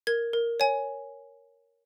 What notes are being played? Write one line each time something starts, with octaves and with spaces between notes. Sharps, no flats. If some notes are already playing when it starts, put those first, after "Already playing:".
A#4 G#6
A#4
C#5 G#5